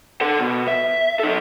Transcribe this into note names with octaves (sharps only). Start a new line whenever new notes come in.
A4 F#5
B2
E5
D#4 A4